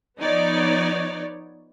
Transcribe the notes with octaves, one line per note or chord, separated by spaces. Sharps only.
F3 B3 D#4 C#5 D5